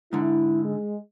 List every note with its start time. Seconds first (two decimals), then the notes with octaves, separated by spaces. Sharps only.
0.13 G#2 D3 E4
0.65 G#3